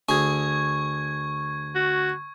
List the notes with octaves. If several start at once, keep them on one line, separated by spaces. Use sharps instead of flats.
D2 G#4 C#6 G#6
F#4